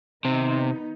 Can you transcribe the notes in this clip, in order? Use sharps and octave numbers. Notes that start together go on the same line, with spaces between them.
C3 D#3 B3 D#4